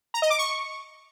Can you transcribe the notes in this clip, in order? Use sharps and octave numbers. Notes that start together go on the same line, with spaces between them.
A#5
D#5
D6
C#6